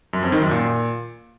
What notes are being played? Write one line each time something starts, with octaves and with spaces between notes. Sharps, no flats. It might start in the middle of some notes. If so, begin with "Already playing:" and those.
F#2
F2
D#3
F#2
A#2